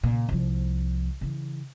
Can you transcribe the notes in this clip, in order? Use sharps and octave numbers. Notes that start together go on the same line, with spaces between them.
A#2 C#3
C2 F3
C#3 E3